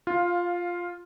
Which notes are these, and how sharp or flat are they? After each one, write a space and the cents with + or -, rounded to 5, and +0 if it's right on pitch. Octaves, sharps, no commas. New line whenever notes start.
F4 +0 F5 +15